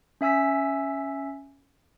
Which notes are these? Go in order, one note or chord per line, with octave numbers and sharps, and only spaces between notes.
C#4 E5 G#5 E6 B6